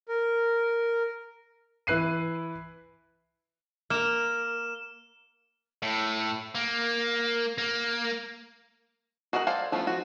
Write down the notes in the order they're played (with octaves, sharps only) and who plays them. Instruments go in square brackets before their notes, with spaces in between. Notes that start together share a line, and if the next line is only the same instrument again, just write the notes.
[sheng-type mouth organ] A#4
[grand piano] E3 E4 B4 F#6 C7 D#7
[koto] A#3 A#4 [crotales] F6 E7
[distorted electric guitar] A2
A#3
A#3
[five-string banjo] F#4 G#4 A#4 D#5 F#5
A4 C5 D5 F5 G#5
F3 A3 B3 C#4 F4
F3 F#4